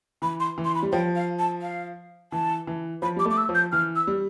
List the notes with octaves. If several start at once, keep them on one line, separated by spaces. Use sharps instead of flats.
E3 B5
C6
E3
C6
B5
G3
F3 G5
F5
A5
F5
E3 A5
E3
F3 B5
G3 D6
A3
D6
E6
F3
G6
E3 F6
E6
G3